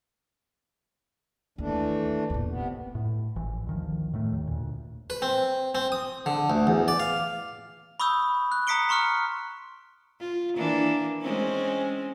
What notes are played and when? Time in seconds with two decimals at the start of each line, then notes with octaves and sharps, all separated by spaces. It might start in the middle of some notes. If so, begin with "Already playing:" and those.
1.58 D#2 E3 A3 D4
2.30 E2 A#2
2.49 C3 B3
2.95 A2
3.36 G#1 E3
3.67 D2 D#3 F3
4.13 A2 D#3 A3
4.33 D#2
4.47 D2 A#2
5.10 B4
5.22 C4
5.75 C4
5.92 D#6
6.26 D3
6.50 D2
6.67 E2
6.88 D5
7.00 F5
8.00 B5 C#6 D#6 E6 G6
8.52 F#6
8.67 A#5 D#6 B6 C#7 D7 G7
8.89 A#5 C6 C#6 F6 C#7
10.20 F4
10.55 E3 A#3 D4
11.21 G#3 C4 C#4